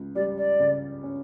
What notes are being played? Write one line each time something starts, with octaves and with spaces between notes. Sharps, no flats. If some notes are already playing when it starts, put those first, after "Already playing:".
Already playing: C#2
G3 D5
D5
C#3
C#4